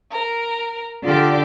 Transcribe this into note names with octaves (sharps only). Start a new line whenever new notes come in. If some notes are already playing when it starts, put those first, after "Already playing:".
A#4
D3 F4 G4 A4 D5